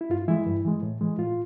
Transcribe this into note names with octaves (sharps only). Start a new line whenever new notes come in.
E4
G2 F4
E3 G#3 E4
G2
E3 G#3
A2
E3 G#3
A2 F4